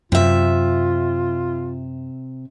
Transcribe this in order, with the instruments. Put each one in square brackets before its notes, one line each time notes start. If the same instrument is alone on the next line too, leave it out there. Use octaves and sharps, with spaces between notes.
[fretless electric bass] F#2 [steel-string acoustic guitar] C3 E5 [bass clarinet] F4